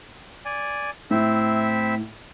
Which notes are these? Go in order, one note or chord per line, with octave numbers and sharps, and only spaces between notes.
D5 G#5
A2 C4 E4 E5